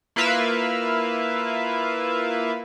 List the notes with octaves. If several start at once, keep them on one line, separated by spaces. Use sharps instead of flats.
A#3 E4 F4 B4 E5 F5